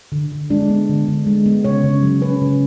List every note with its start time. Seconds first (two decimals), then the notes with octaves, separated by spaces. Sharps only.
0.12 D3
0.32 D3
0.50 G#3 D4
0.69 B3
0.89 D3
1.08 D3
1.26 G#3
1.46 B3
1.64 C#3 C#5
1.84 C#3
2.03 F#3
2.22 C#4 B4
2.41 C#3